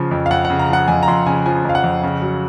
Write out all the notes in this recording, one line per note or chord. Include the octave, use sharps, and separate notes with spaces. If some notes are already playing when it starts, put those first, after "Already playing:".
Already playing: C#3 F3
F2
F5
F2 F#5
F#5
C#3
A#5
F3 F#5
F2 G#5
A#5
F2 C6
C#3 G#5
F3 G#5
F2 F5
F#5
F2
C#3
F#3